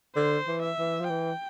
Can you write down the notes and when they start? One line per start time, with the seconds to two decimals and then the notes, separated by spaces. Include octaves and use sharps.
0.16 D3 C5
0.48 E3
0.62 E5
0.79 E3
1.00 F3
1.10 E3 G5